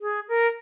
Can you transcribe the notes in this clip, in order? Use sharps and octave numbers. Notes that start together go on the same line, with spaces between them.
G#4
A#4